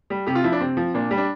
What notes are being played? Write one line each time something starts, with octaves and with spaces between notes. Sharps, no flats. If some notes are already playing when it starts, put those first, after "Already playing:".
G3
C3 G4
F4
F3 E4
D4
C3 C4
F3
A#2 D4
G3
D4